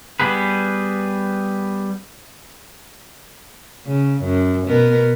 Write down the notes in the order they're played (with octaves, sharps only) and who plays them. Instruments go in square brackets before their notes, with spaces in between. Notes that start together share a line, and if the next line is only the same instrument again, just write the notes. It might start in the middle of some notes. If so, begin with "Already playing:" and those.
[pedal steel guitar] G3 B3 G#4 B4
[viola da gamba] C#3
F#2
B2 B3 A#4